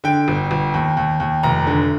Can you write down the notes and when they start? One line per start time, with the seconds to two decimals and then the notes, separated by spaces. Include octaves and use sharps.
0.04 D3 G5
0.28 G1
0.51 G1
0.74 D#2
0.97 D#2
1.20 D#2
1.43 F1 A#5
1.67 D3